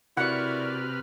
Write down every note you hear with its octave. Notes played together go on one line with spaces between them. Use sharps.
C3 E4 F#4 A#4 B4 D5 F#5 F6